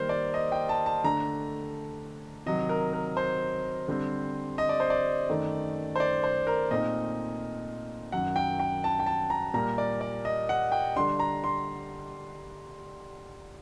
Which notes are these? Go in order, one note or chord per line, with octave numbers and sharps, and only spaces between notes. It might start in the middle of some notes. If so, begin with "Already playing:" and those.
Already playing: D#3 G3 A#3 A#4 C5
D5
D#5
G5
A5
A5
D3 A3 D4 A#5
C3 D#3 F#3 D#5
A#4
A#4
C5
D3 G3 C4
D#5
D5
C5
D5
F#2 D#3 A3 D#4
C5
D5
C5
A#4
A#2 A3 C4 D#4 D#5
F#2 D#3 F#3 F#5
G5
G5
A5
G5
A5
A#5
A#2 G3 A#3 A#5
D5
D5
D#5
F#5
G5
D3 G3 D4 C6
A#5
C6